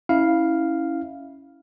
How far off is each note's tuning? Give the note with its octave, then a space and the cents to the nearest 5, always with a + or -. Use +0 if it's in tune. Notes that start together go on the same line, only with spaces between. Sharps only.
C#4 +0 E4 -15 F5 +0